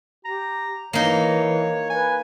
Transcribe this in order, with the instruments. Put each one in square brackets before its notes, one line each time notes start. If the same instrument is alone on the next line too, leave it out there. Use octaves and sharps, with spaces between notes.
[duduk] G4 [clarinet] A#5
[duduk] E3 [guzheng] A#3 D#4 [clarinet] C#5
[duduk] B4 [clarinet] G#5